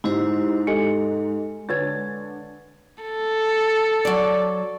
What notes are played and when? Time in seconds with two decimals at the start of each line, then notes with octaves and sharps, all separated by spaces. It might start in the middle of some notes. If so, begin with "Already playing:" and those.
0.04 G#2 E4 G4 C5
0.67 G#3 G4 A4 D#5
1.69 D3 D4 B4 C#5 G#6 A6
3.04 A4
4.05 F#3 D5